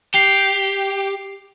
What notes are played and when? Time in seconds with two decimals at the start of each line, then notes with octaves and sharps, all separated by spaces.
0.15 G4 C7 F7